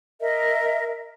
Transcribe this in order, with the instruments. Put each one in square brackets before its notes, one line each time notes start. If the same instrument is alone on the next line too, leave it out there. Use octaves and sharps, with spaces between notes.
[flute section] A#4 D#5 E5